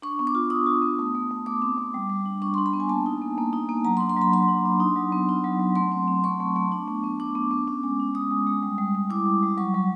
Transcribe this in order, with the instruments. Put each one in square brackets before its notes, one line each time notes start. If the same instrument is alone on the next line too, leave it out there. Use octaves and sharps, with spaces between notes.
[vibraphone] D4 C#6
B3
D6
F4
D4 D#6
F4
B3
A3
A3
A3
A3 D6
C4
A3
G3
G3
D4
D4 C#6
C6
D4
B5
B3
G#5
A#3 A5
D#4
A#3
A#3
D#4
A#3
F#3 A#5
C6
D4
C6
F#3 B5
F#3 C6
D4
D4
D#4
F#3
B3
D#4
F#3
F#3
A3 C6
C4
C4
A3 C#6
A3
A3
D4
B3
B3
D4 D6
B3
B3
C#4
G#3
C#4
G#3 D#6
G#3
G#3
G3
G3
G3
E4 D6
G3
G3
F#3 C#6
F#3